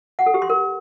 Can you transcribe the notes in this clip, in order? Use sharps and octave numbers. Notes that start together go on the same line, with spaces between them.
F#5
A4
G4
C6
A#4